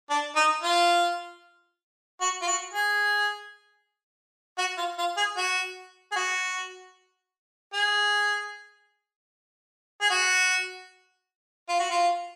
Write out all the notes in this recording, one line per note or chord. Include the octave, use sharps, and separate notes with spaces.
D4
D#4
F4
F#4
F4
F#4
G#4
F#4
F4
F4
G#4
F#4
G#4
F#4
G#4
G#4
F#4
F4
F#4
F4